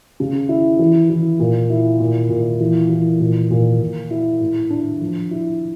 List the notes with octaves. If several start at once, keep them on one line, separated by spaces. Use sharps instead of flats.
C#3
E4
E3
E3
A#2
E4
A#2
A#2
E3
E3
A#2
A#2
A#2
E4
A2
D4
F3
E4